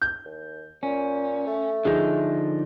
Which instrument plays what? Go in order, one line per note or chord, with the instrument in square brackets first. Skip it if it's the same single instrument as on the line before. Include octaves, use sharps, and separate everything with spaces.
[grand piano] G6
[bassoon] D#2
[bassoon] A#2 [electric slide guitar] C#4
[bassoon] A3
[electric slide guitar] D3 F3 D#4 [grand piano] G#4